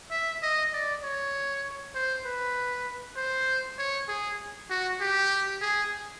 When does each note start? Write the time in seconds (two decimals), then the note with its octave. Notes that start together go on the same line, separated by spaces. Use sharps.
0.11 E5
0.42 D#5
0.73 D5
1.03 C#5
1.94 C5
2.25 B4
3.16 C5
3.78 C#5
4.08 G#4
4.70 F#4
5.01 G4
5.62 G#4